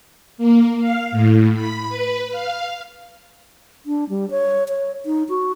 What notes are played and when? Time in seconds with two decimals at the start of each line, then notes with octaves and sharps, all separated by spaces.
0.38 A#3
0.78 F5
1.11 A2
1.54 B5
1.89 B4
2.30 F5
3.86 D4
4.09 G3
4.31 C#5
4.69 C#5
5.06 D#4
5.29 F#4